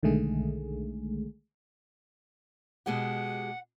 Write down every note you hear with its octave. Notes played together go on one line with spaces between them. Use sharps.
B1 D3 D#3 G#3 A3 G#4
B2 G#3 G4 F#5